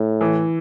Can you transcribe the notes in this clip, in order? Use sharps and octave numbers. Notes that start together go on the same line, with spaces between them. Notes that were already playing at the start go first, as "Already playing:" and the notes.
Already playing: A2
E3